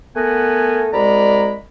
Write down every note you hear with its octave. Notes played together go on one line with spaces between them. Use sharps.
A3 B3 A#4 F#5 G#5
C2 G#3 D5 A#5 B5